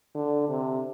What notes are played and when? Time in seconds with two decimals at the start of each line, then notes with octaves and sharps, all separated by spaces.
0.15 D3
0.49 C3